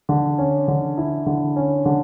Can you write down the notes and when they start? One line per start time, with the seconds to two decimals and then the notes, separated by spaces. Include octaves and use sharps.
0.09 D3
0.38 C#4
0.68 D3
0.98 E4
1.26 D3
1.56 C#4
1.86 D3